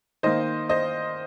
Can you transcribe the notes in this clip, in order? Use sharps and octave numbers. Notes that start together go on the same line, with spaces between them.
D#3 A#3 C5 D#5
C5 D#5